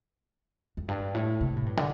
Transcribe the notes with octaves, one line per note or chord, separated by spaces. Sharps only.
F2
G2
A2
C3
A2
G2
D3